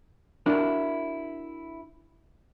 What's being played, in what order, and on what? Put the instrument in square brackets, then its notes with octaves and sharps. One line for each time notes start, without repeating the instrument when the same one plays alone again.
[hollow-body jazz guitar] D4 E4 F#4 A#4